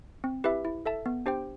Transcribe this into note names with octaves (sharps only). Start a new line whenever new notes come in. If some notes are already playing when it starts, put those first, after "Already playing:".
C4
E4 G4 B4 E5
E4
A4 E5 A5
B3
D4 G4 C5 G5